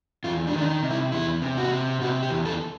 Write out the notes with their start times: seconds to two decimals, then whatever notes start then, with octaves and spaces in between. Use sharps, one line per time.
0.24 E2 F4
0.47 D4
0.53 D#3
0.58 D4
0.68 D#4
0.83 C3
0.91 E4
1.12 E2 E4
1.42 C3
1.57 F#4
1.71 C3
2.01 C3 F#4
2.23 G4
2.30 E2
2.45 A4